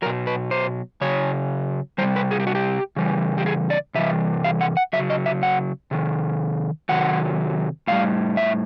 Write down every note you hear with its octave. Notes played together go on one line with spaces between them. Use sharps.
B2 F#3 A#4
B4
C5
C#3 F#3 C#5
C3 E3 G3 C5
B4
G#4
G4
F#4
G4
C#3 E3 G3
G4
G#4
D5
C3 E3 G3 E5
F5
F#5
F#5
C#3 F#3 E5
D#5
E5
F#5
C3 D#3
C3 D#3 F#3 F#5
A2 E3 G3 F5
E5